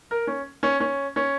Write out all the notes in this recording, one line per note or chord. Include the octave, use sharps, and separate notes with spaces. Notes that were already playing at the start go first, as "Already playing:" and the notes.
A#4
C#4
C#4
C#4
C#4